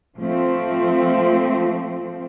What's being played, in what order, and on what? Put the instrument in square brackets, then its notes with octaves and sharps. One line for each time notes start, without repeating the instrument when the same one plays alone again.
[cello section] F3 A3 C4